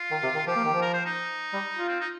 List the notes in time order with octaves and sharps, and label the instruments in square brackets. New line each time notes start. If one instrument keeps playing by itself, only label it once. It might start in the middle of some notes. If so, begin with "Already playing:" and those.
Already playing: [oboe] F4
[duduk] D#3
C3
D#3
[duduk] F3 [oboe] G4
[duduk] A#3
D#3
F3
[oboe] A#4
C5
D#4
[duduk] G3
F4
[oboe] C4
D#4